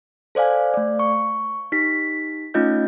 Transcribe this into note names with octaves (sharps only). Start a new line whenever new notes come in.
A4 C5 D5 F5 G#5
A3 D5
C#6
D#4 G4 B6
A3 C#4 D#4 F4 D#5 G6